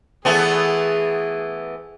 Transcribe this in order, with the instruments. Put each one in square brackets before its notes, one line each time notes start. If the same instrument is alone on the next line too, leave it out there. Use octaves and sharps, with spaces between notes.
[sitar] E3 A3 B3 [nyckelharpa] G#4